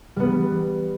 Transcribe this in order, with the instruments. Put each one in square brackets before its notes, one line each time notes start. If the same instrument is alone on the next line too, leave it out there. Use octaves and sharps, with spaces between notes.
[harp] G3 B3